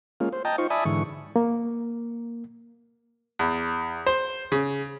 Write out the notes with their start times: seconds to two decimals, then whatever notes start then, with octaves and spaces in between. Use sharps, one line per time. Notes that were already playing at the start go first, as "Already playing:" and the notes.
0.20 G#3 A#3 C#4 F4
0.33 C5
0.45 D#5 G5 A5 A#5
0.58 D#4 F4 C5 C#6
0.70 D5 E5 G#5 A5 B5 D#6
0.85 G#2 D3 E3 C#6
1.36 A#3
3.39 E2
4.07 C5
4.52 C#3